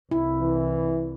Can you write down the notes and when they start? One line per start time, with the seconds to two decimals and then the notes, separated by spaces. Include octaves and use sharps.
0.11 C2 E4
0.41 E3